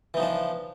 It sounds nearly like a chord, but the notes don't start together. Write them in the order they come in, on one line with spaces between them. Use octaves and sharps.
E3 D#4 F3 D4